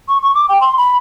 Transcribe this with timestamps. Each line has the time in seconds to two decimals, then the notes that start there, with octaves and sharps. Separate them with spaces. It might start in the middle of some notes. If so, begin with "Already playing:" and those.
0.08 C#6
0.22 C#6
0.35 D6
0.49 G5
0.61 C6
0.78 B5